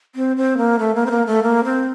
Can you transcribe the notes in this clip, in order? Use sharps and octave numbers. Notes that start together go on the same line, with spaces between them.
C4
C4
A#3
A3
A#3
C4
A#3
A3
A#3
C4